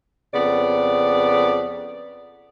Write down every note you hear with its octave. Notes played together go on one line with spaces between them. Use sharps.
F2 C#3 B3 D5